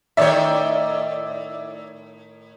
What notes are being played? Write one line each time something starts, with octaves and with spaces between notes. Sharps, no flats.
A2 D#3 C#5 D5 E5